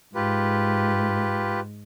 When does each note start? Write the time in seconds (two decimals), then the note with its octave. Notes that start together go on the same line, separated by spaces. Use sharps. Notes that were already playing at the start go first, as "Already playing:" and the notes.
0.15 G#2 F4 G4 B4